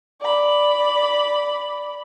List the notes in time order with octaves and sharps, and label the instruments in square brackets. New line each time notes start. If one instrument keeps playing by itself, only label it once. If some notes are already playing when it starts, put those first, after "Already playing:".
[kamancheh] D5 B5